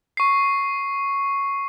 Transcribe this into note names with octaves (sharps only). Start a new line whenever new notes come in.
C#6 C7